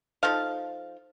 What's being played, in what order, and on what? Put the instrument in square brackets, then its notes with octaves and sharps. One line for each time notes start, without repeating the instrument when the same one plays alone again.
[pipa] F3 D#4 A4 F5